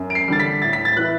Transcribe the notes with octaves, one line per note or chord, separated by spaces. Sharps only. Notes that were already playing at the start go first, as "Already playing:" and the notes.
Already playing: F#2
D7
C7
D3 G3 A6
B6
A2 A6
B6
A6
E3 B3 E4 F#6